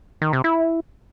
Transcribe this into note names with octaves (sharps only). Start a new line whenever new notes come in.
D#3
C3
E4